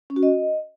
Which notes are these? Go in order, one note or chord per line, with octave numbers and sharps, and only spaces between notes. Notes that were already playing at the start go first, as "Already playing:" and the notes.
C#4
F#4
D#5